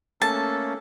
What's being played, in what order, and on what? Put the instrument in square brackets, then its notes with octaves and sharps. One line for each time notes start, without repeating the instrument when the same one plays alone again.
[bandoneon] A3 A#3 C#4 [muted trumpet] A4 [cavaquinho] A5